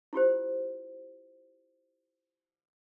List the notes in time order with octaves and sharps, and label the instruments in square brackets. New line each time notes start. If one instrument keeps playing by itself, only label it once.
[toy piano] E4 F4 G4 C5